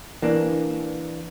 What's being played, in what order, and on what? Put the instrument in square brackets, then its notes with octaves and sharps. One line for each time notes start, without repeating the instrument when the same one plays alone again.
[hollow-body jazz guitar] E3 A#3 D4